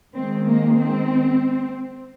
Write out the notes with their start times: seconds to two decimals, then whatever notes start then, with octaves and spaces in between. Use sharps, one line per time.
0.15 D#3 G#3 C4
0.46 A#3
0.77 C4